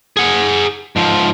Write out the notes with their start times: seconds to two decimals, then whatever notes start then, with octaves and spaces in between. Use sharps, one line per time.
0.17 G#4 F#5
0.96 G#2 F3